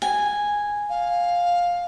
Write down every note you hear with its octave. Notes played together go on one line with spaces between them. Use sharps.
G#5
F5